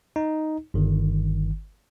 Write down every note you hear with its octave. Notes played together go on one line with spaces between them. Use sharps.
D#4
G1 D#3